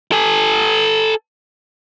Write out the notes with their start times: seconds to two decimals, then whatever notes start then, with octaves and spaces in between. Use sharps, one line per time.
0.12 A4 G#5